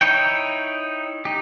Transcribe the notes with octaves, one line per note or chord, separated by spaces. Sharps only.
D#4 E4 C#5 G5
D#4 G4